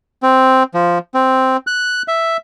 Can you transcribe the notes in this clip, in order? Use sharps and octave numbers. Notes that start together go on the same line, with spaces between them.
C4
F3
C4
F#6
E5